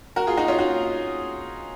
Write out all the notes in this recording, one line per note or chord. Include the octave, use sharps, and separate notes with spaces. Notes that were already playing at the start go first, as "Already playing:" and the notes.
F#4 A#4
F4 G#4
D#4 F#4
C#4 F4
D#4 F#4